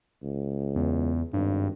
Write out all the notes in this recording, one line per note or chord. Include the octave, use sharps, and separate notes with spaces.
C#2
E2
G#1 G2